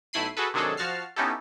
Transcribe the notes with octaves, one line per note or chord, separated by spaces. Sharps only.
B1 A3 E4 B5 C7 D#7
F#4 G#4 A4 B4
C3 D#3 F#3 D4 G#4 A4
F3 F#4 A5 F6 C7
B3 C#4 D#4 E4 G4 A4